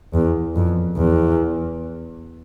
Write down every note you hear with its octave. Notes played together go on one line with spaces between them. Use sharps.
E2
F2
E2